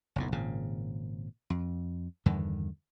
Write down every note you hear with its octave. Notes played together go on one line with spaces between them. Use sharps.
F#1 B1 A2
G#1 A#2 C#3
F2
E2 G2 D3 D#3